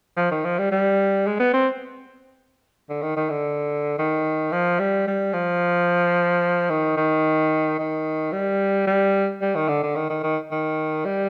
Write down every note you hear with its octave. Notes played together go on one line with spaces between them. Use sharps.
F3
D#3
F3
G3
G3
G#3
B3
C4
D3
D#3
D#3
D3
D#3
F3
G3
G3
F3
D#3
D#3
D#3
G3
G3
G3
D#3
D3
D3
D#3
D#3
D#3
D#3
G3